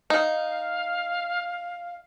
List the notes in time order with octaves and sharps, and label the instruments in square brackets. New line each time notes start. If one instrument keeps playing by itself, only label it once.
[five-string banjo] D#4 [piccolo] F5